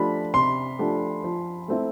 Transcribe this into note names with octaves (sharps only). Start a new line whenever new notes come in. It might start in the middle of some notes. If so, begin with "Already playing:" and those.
Already playing: F3 A3 D4 G4 B5
C3 C6
F3 A3 D4 G4
F3
A3 C4 E4